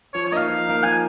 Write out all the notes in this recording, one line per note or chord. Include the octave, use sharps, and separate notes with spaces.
F3 C#5
C#5
A#3 D#4 D#5 F5
F3
A#3 D#4
F3 G#5